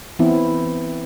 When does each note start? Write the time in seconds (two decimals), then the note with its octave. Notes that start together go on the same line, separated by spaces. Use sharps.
0.19 E3 B3 C4 E4